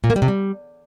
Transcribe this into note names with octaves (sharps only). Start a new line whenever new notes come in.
A#2
A#3
G3
C3
G3